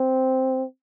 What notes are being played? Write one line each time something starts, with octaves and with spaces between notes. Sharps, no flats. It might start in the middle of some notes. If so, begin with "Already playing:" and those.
Already playing: C4